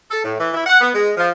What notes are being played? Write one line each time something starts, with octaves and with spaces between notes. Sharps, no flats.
A4
A2
E3
E4
F#5
B3
G#3
F3